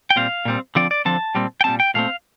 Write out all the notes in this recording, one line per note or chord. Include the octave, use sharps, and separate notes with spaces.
G5
A#2 G3 C4 F5
A#2 G3 C4
D3 F3 C4 D5
D5
D3 F3 C4 A5
A#2 G3 C4
G5
A#2 G3 C4 A5
G5
A#2 A3 C4 F5